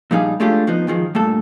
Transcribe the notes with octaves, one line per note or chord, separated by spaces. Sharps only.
A#2 F3 G3 D#4 G#4 F5
G#3 A3 D4 F4 G4 A4
F3 B3 D#4
G#2 D#3 F3 G#3
G2 A#2 A3 A4